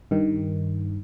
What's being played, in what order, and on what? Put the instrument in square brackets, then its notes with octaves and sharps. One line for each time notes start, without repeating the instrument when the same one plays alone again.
[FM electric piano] G2 D#3